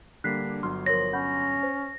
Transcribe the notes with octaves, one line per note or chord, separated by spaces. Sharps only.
D3 G3 A#3 F#6 B6 C7
D4
G1 F#3 C6 F6
F3 A#4 C#5 A#6
C#4 F#5 B5 G6
C5